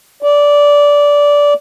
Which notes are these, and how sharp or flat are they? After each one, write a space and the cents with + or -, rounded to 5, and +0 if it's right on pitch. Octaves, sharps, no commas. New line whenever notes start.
D5 -15